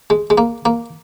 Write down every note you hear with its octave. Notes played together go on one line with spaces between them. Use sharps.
G#3
G#3
A#3
A#3